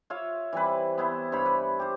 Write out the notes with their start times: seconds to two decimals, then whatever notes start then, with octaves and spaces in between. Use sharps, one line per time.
0.10 F4 C#5 E5 F5
0.53 E3 G3 C4 B4
0.98 B3 E4 C5
1.32 G2 C5 C#5 B5
1.46 B4
1.79 G4 C5